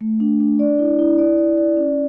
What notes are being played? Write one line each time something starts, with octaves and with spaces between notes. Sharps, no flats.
A3
D4
D4
D5
E4
E4
D5
D5
D5
C#4